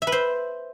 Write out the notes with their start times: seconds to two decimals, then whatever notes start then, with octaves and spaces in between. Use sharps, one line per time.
0.02 E5
0.07 B4
0.12 C5